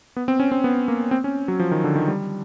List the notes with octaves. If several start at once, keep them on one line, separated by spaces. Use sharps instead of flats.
B3
C4
C#4
C4
B3
A#3
C4
C#4
F#3
F3
D#3
D3
D#3
G3